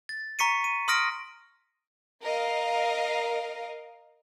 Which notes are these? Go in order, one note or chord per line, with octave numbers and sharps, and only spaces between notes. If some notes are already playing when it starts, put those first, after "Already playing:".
A6
A#5 C#6 B6 C#7 D#7
D#7
C6 D#6 F6 A#6 D7
A#4 D#5 F5